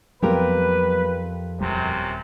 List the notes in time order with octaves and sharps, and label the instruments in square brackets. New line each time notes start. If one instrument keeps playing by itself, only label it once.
[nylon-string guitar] F2 G4 A#4 [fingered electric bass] F#3 G3 B3 [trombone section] B4
[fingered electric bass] D#1 B1 G3 [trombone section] F#2 C3